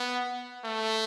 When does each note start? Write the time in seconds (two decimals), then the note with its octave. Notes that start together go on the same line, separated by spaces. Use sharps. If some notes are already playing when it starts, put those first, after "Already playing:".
Already playing: B3
0.64 A3